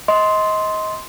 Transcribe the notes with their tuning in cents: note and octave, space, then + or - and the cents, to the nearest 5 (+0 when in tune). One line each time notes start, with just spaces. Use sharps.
D#5 +25 C6 +0